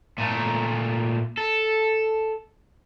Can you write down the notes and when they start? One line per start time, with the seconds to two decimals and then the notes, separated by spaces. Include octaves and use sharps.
0.18 A#2 A3
1.38 A4